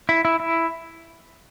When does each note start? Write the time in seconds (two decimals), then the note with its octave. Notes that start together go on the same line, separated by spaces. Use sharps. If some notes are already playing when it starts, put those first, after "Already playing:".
0.09 E4
0.25 E4
0.40 E4